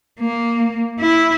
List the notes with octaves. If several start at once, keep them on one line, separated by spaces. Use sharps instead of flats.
A#3
E4